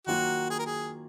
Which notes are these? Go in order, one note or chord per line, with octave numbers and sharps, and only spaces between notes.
D#3 F#3 A#3 F4 F#4
G#4
A#4
G#4